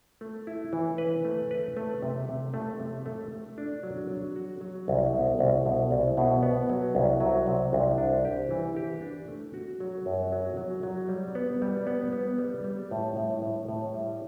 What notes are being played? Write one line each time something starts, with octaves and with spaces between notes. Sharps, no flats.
A3
E4
E3
B4
A3
B4
A3
C3
C3
A3
C3
A3
A3
D4
F#3
F#3
F#4
F#3
C2
B2
C2
B2
C2
B2
B3
F#3
C2
F#3
C3
C2
D4
G4
E3
G4
D4
A3
F#4
F#3
F#2
F#3
F#3
F#3
G3
B3
G3
B3
B3
G3
G3
A2
A2
A2
A2
G3